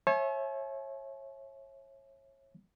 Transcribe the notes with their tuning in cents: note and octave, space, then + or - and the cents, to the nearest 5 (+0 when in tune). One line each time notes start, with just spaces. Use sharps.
C#5 -30 E5 +0 G#5 +45